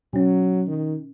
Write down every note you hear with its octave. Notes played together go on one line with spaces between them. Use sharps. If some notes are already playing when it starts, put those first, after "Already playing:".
B2 F#3 C#4
D#3